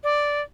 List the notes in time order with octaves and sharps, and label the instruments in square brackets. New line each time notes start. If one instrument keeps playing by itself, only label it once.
[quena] D5